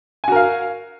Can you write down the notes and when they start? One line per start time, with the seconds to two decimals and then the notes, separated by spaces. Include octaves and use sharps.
0.24 G#5
0.28 F#4
0.32 A#4
0.36 F5